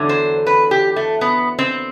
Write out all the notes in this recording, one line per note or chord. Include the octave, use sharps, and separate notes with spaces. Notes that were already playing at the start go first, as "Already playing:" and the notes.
Already playing: E2 D3 F#3
C5
B4
G4
A3
B3
C4